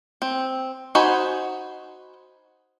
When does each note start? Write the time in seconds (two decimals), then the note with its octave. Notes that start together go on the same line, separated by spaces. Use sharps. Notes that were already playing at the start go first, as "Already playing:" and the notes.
0.22 C4
0.95 D#4 F#4 C5 G#5 B5